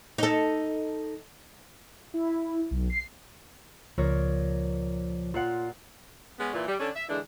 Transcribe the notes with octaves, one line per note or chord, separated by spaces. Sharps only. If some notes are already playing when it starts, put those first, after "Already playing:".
D#4 A4
E4
B1
C7
C#2 A#2 F3 A#4 C#5
A#2 F4 F5 F#5
G#3 B3 C#4
A#2 E3
G3
D3 C#4 D4 A4
E5
D3 E3 G#3 D4